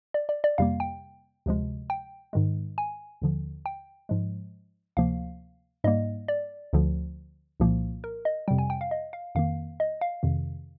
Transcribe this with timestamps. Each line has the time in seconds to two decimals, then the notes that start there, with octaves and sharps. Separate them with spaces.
0.14 D5
0.29 D5
0.44 D5
0.58 F2 C3 G3 A#3 F5
0.80 G5
1.46 D2 C3 F3 G#3
1.90 G5
2.33 G#2 D#3 G#3
2.78 G#5
3.22 D#2 D3 F3
3.66 G5
4.09 G#2 F3 G#3
4.97 D2 C3 F3 A#3 F5
5.84 G#2 G3 A#3 D#5
6.28 D5
6.73 D2 D3 F3
7.60 C2 A#2 F3 A#3
8.04 A#4
8.25 D#5
8.48 F2 C3 G3 G5
8.58 G#5
8.70 G5
8.81 F5
8.91 D#5
9.13 F5
9.35 F2 D#3 A#3 F5
9.80 D#5
10.01 F5
10.23 F2 C3 D#3